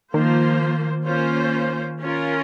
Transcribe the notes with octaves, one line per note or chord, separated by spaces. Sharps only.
D#3 F3 A#3 F4 C5
A#3 C#4 F4 C5
C#4 F4 A#4